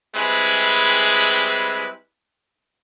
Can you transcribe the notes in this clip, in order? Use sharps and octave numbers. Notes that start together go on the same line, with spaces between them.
G3 G#3 C4 E4 G#4 B4